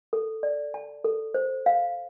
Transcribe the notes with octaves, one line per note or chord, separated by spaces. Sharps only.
A4
D5
A5
A4
C5
F5